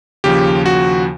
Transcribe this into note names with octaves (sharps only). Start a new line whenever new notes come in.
D#2 C#3 F3 G4
F#4